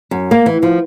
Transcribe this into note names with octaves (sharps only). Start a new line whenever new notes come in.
F#2
A#3
E3
F3